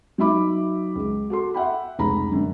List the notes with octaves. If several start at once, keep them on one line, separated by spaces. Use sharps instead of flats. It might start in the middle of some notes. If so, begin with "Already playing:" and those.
F#3 D#4 E5 B5 D6
C#2
F#4 A4 C6
E5 F#5 G5 B5
F1 C#2 A#5 B5
F#2 D3